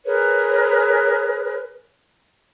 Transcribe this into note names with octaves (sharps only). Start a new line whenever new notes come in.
G#4 A#4 B4 C#5